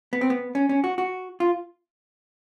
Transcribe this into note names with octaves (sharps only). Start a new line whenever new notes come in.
B3
C4
B3
C#4
C#4
F#4
F#4
F4